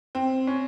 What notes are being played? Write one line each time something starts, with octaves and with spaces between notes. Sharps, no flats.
C4
C#4